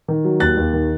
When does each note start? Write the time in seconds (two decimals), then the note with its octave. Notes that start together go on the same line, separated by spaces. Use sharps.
0.08 D#3
0.25 F#3
0.40 D#2 F#6 A6
0.57 D#2
0.73 D#3